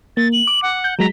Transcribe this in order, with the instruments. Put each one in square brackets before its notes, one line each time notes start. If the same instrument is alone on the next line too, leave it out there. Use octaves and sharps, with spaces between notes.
[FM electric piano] A#3 [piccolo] A6
[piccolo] F#7
[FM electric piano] D6
[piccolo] F#5
[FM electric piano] G6
[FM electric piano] F#3 G#3 B6 [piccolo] A#5